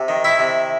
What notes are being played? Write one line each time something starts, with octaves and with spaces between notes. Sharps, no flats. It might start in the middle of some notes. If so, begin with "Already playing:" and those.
Already playing: C3
D#3
E4 E5
C3